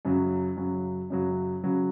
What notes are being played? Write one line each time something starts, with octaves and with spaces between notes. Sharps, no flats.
F#2 C#3 F#3
F#2 C#3 F#3
F#2 C#3 F#3
C#3 F#3